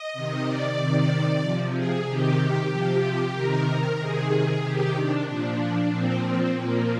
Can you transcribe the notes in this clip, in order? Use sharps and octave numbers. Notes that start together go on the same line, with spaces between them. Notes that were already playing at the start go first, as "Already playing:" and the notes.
Already playing: D#5
C3 D#3
D5
C3 D#3
C3 F3
G#4
C3 D#3 G4
C3 F3
C3 D#3 A#4
C3 D#3 G#4
C3 D#3 G4
D4
A#2 F3
A#2 F3 C4
C4
A#2 F3 A#3